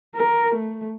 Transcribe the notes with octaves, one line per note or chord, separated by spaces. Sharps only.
A#4
A3